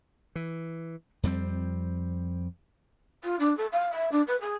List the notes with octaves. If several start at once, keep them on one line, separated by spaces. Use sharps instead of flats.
E3
F2 G3 A3 C4
F4
D4
A4
F5
E5
D4
B4
G#4